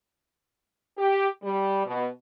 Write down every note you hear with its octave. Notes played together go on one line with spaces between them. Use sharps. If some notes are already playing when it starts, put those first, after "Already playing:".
G4
G3
B2